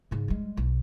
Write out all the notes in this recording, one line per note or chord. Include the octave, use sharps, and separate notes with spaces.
G#2 C#3
G3 G#3
B1